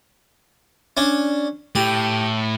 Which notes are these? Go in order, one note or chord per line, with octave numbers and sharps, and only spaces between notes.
C#4 D4
A2 G4